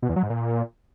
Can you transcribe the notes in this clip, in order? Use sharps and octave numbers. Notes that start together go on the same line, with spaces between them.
B2
E2
F#3
G#2
A#2